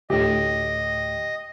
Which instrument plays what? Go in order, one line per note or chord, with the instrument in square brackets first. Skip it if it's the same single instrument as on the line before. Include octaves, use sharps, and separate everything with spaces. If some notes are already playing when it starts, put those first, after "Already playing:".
[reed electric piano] D2 A2 [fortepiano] G4 [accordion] D#5